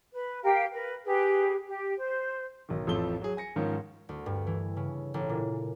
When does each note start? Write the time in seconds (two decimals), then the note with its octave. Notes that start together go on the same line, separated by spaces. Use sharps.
0.13 B4
0.43 G4 A#4 F5 G5
0.72 A#4 B4
1.04 G4 G#4 B4
1.65 G4
1.96 C5
2.69 B1 D#3
2.87 A1 F2 F3 A4 G7
3.22 F#3 G#4
3.37 G#5 A#6 C#7
3.56 G#2 D#3 F3 C#4
4.09 D2
4.26 G2
4.47 E3
4.77 C#3
5.14 A1
5.29 A#2